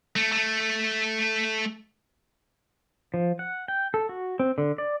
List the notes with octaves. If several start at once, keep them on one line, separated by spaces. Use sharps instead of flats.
A3
A3
F3
F#5
G5
A4
F#4
C4
D3
D5